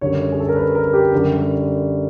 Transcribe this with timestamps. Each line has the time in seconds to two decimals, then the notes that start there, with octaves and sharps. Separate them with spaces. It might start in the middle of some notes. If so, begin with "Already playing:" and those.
0.01 F#2 D3 G3 C#5
0.32 G#4
0.40 A4
0.48 A#4
0.56 B4
0.75 A#4
0.93 G4
1.12 F#2 D3 G3